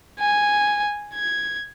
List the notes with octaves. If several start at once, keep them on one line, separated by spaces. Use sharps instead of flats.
G#5
G#6